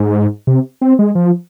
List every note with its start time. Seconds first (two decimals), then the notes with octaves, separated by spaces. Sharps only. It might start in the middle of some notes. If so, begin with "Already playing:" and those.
Already playing: G#2
0.47 C3
0.81 C4
0.99 G#3
1.15 F3